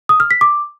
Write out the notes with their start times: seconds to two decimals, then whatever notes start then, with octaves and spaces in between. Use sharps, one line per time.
0.09 D#6
0.20 F6
0.31 B6
0.41 D6